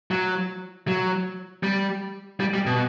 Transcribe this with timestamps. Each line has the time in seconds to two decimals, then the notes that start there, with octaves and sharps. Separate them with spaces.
0.11 F#3
0.88 F#3
1.63 G3
2.40 G3
2.54 G3
2.66 B2